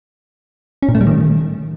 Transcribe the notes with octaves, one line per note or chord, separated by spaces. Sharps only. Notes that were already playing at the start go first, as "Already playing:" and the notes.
C#4
A#2
A3
G3
D#3